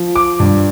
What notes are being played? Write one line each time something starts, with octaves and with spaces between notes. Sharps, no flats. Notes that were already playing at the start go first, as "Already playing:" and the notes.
Already playing: F3
D6
G2